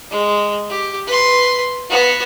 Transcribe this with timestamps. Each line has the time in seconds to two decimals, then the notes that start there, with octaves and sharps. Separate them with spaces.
0.11 G#3
0.70 G4
1.07 B4 C6
1.90 B3 F#4